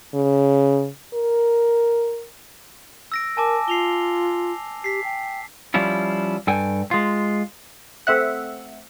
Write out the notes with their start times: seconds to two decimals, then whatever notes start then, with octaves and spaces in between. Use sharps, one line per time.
0.14 C#3
1.13 A#4
3.12 E6 A#6 D7
3.37 A#4 G#5 A5 D6
3.68 F4 C7 F7 G7
4.84 G4 B6 C7
5.04 G5
5.74 F3 G3 C#4 E4 F4
6.47 G2 A4 G5 G#5
6.91 G#3 F4
8.07 A3 C4 E5 F#5